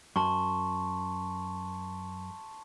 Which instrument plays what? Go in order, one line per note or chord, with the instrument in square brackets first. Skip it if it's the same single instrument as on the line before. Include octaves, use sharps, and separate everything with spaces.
[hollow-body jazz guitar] F#2 [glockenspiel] A5 C6 C#6